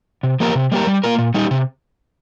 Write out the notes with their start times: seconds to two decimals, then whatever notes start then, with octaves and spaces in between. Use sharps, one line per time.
0.23 C3
0.40 F3 A#3 G4 A#4
0.55 C3
0.72 G3 A#3 G4 A#4
0.87 G3
1.04 A#3 F4 A#4
1.18 A#2
1.34 G3 D#4 G4
1.51 C3